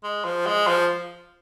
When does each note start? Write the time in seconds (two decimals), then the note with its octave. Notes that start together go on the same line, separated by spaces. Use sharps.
0.03 G#3
0.25 F3
0.46 G#3
0.68 F3